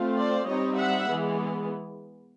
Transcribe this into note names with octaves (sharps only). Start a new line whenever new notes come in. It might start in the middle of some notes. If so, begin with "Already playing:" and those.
Already playing: A3 C4 F4
C5 D5
G3 C4 D#4 C#5 D#5
E5 F#5
E3 G#3 B3